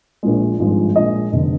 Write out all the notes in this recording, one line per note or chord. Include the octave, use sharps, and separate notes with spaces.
A#1 A#2 F3 G#3
G#1 G2 F3 G#3
A#1 A#2 G#3 D#5
F1 D3